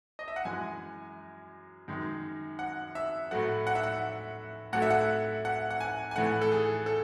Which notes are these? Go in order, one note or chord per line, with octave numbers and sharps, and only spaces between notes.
D#5
E5
F#5
F#2 E3 G#3 G#5
F#2 D#3 G#3
F#5
E5
A2 F#3 A3 F#5
F#5
E5
F#5
A2 F#3 A3 F#5
E5
F#5
F#5
F#5
G#5
G#5
A2 E3 A3 F#5
A4
G#4
A4